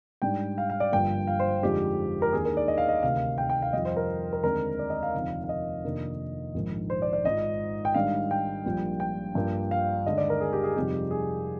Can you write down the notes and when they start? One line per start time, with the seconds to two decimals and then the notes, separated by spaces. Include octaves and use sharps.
0.22 G#2 G3 D4 G5
0.58 F5
0.70 F5
0.80 D5
0.92 G1 G2 F3 A#3 G5
1.27 F5
1.39 C5
1.63 F2 D3 F3 G#3 D#4 G4
2.22 A#4
2.33 D#2 D#3 A#3 D4 G#4
2.45 A#4
2.57 D5
2.68 D#5
2.78 F5
2.89 D#5
3.03 D2 C3 D#3 F5
3.38 G5
3.49 G5
3.62 F5
3.73 F2 D#3 G3 D#5
3.85 C5
3.96 A#4
4.33 A#4
4.43 D#2 D3 G#3 C4 D#4 A#4
4.79 D5
4.90 D#5
5.03 F5
5.14 F1 D#2 D3 F3 C4
5.44 F5
5.49 D#5
5.84 F2 C3 D#3 A#3 D4
6.54 A#1 G#2 D#3
6.90 C5
7.02 D5
7.13 D5
7.25 G#1 G#2 F3 D#5
7.85 G5
7.94 G#2 D#3 G3 D4 F5
8.31 G5
8.65 A#1 A#2 G3
9.00 G5
9.35 G2 F3 A#3 D4
9.71 F5
10.05 D#2 D3 G#3 D#5
10.18 D5
10.30 A#4
10.41 G#4
10.53 G4
10.64 G#4
10.76 F2 C3 G3 C4 D#4 G4
11.11 G#4